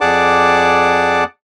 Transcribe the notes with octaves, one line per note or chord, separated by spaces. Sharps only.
F2 G#4 D5 F#5 A5 D6